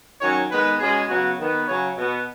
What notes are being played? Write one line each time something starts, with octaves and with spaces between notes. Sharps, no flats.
D#3 F#3 C#4 C#5
D#3 G#3 B3 B4
B2 G#3 C#4 G#4
C#3 F#3 B3 F#4
D#3 B3
C#3 F#3 C#4 C#5
B2 B3